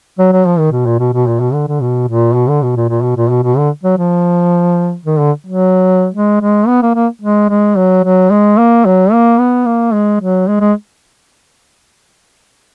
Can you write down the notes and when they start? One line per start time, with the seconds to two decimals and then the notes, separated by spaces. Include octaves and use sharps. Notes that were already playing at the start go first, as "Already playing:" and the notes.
0.19 F#3
0.32 F#3
0.46 F3
0.59 D#3
0.72 B2
0.86 A#2
1.00 B2
1.14 B2
1.27 A#2
1.40 B2
1.53 D3
1.68 D3
1.82 B2
2.08 A#2
2.35 B2
2.49 D3
2.63 B2
2.76 A#2
2.90 A#2
3.03 B2
3.17 A#2
3.30 B2
3.43 B2
3.58 D3
3.83 F#3
3.98 F3
5.05 D#3
5.20 D3
5.47 F#3
6.14 G#3
6.41 G#3
6.68 B3
6.83 A#3
6.95 A#3
7.22 G#3
7.49 G#3
7.76 F#3
8.04 F#3
8.30 G#3
8.58 A#3
8.86 F#3
9.12 A#3
9.39 B3
9.66 A#3
9.94 G#3
10.21 F#3
10.48 G#3
10.61 G#3